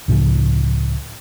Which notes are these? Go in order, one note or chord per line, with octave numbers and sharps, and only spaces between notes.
C#2 A2 C#3 F3